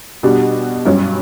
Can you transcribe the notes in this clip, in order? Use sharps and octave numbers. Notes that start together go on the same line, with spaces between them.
B2 G3 D4 F#4
G2 F#3 C#4